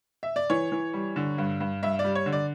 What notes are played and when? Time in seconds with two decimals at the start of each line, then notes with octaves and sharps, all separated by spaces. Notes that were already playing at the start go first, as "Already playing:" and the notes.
0.23 E5
0.36 D5
0.50 E3 C#5
0.72 E3
0.93 G3
1.16 D3
1.38 G2
1.60 G2
1.83 G2 E5
1.99 D5
2.04 G3
2.15 C#5
2.26 D3
2.33 D5